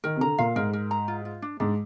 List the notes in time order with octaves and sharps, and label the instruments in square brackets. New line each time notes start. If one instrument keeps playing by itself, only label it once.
[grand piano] D#3 [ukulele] A#4
[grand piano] C3
[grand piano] D3 [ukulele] A#5
[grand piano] A#2 [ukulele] F5
[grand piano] G#2 [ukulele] A#4
[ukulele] A#4
A#5
F4
F4
D4
[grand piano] G#2 [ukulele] D4